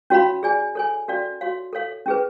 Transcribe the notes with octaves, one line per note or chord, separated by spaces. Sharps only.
C#4 F#4 C#5 F5 B5
G#4 D5 G#5
A4 C#5 G#5
C#4 F#4 A4 D5 F5
F#4 C#5 F5
A4 C#5 F5
C#4 G#4 B4